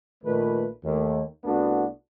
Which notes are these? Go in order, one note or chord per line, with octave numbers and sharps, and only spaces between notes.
A#1 A#2 D#3 A3 B4
D#2 A3
C2 A3 B3 D4 E4 F#4